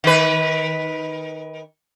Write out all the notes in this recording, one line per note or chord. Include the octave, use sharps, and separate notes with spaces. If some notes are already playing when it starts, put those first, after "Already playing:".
D#3 B4